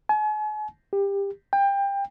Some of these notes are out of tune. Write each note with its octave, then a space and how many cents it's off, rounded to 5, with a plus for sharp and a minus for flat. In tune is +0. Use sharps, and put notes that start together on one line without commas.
G#5 +40
G4 +20
G5 +25